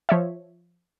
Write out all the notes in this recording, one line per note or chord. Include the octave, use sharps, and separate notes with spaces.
F3 C#5 E5